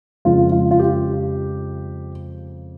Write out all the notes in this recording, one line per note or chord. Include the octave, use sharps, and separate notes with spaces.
F2 C#3 F3 G#3 F4
F4
F4
G4